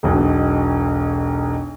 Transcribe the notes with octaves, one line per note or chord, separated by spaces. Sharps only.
E1 B1 B2